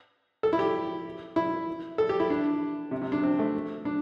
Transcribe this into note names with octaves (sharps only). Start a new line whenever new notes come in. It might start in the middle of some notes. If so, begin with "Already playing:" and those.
A4
E4
G4
E4
A4
G4
E4
D4
C3
C3
D4
C4
A3
D4